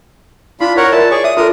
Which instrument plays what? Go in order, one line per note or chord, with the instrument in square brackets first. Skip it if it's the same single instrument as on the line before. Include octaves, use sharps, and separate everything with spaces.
[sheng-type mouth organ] D4 F4 B5 [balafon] E4
[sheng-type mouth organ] A#4 C#5 F#5
[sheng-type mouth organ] E4 A5 [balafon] F4 A#4 D5
[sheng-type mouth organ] G#4 D5 C#6 [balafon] C#5
[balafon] E5 [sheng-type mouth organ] D#6
[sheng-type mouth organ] D4 A#4 D#6 [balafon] F4 A4